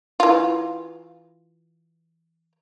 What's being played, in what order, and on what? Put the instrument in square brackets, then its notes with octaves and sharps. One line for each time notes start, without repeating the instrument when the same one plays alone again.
[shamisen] E3 F4